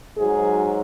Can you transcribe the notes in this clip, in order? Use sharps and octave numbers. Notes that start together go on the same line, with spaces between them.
G#2 F#3 G#4